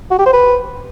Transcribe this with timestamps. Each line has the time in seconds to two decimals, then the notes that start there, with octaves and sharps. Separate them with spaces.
0.11 F#4
0.18 G4
0.26 C5
0.33 B4